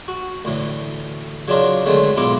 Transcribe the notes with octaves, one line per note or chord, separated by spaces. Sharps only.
F#4
D2 A2 E3
C#3 F#3 D4 D#4 F4 A#4
D3 D#3 G#3 A3 C4 C#4
B1 G#2 B3 E4 F4 D6